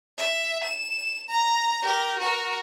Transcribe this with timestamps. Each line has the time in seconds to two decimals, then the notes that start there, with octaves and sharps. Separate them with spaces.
0.18 E5
0.64 E7
1.29 A#5
1.82 G4 A#4
2.19 F#4 A#4